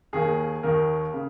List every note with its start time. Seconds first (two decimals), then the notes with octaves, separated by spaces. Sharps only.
0.13 D#2 D#3 A#3 G#4
0.63 D#2 D#3 A#3 A#4
1.14 C#3